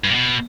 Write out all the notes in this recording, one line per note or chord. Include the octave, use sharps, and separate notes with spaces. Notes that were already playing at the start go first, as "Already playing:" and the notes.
G2
A#2
B2